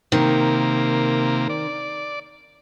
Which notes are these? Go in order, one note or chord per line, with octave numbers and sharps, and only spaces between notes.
C3 D#3 A#3
D5